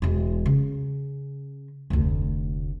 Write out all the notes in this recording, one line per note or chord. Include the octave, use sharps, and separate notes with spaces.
E1 G#3
C#3
F1 D2